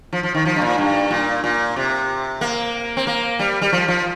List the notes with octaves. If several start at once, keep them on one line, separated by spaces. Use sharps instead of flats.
F3
F3
D#3
F3
G2
A#2
G2
A#2
A#2
C3
A#3
C4
A#3
G3
G3
F3
F3